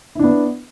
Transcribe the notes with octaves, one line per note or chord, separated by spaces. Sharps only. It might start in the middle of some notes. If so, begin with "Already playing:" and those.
B3 D4 E4